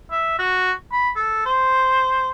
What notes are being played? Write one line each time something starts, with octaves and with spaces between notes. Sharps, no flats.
E5
F#4
B5
A4
C5